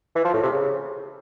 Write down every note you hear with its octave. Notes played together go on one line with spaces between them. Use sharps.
E3
F3
A2
C3
C#3